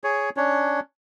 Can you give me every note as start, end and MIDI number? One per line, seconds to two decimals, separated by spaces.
0.04 0.30 68
0.04 0.30 73
0.37 0.80 61
0.37 0.80 62
0.37 0.80 73